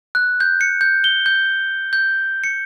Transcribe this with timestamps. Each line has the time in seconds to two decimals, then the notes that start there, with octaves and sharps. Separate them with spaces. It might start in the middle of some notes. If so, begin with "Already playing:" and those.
0.15 F#6
0.40 G6
0.61 C#7
0.81 G6
1.04 G7
1.26 G6
1.93 G6
2.44 C#7